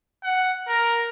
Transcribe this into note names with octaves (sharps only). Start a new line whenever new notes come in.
F#5
A#4